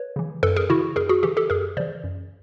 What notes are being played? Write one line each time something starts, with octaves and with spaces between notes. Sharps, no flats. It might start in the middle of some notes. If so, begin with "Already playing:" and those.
Already playing: B4 C#5
C#3 E3
F#2 A4 B4
G#4 A#4
C#3 E3 E4 F#4
F#2 G#4 A#4
F#4 G#4
C#3 E3 G4 A4
G4 A4
F#2 G#4 A#4
C#3 E3 C5 D5
F#2